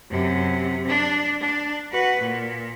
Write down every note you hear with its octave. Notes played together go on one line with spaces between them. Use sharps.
F#2 C3
D4
D4
F#4 B4
A#2